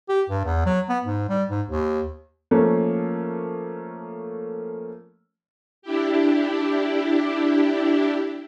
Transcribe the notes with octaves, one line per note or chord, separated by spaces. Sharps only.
G4
G2
E2
F#3
B3
G#2
G3
G#2
D#2
F3 A3 A#3 C#4
D4 E4 G4